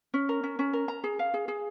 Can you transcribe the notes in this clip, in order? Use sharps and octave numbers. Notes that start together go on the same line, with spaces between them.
C#4
A#4
C#4
C#4
A#4
A#5
G#4
F5
G#4
G#4